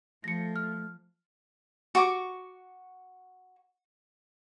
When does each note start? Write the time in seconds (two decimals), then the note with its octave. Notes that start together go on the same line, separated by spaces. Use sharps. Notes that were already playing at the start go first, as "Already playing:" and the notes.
0.24 F3 A3 A#6 C#7
0.56 F6
1.95 F#4 C#6 D6